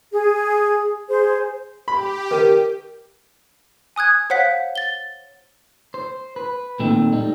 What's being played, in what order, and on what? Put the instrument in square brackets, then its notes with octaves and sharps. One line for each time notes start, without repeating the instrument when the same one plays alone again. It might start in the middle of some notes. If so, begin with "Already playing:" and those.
[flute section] G#4
G#4 C5
[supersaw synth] G4 [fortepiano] B5
[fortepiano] D#3 [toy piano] A#4 B4
[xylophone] G#5 D#6 F#6 G#6
C5 C#5 F5 F#5 F#6 B6
A6 G7
[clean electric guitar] C5
B4
A#2 D#3 A3 C4 D#4
G3 D#4